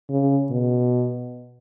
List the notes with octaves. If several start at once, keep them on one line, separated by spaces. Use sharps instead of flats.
C#3
B2